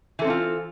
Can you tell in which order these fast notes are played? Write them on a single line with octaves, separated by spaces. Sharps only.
E3 A4 C4 D#4 F4